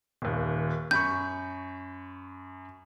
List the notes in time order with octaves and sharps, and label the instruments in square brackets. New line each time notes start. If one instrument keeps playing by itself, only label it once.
[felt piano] D#1 D#2
[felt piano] F#2 B5 C#6 [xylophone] G6